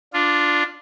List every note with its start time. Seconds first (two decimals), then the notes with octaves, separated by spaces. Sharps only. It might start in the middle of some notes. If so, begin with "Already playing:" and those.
0.13 D4 F4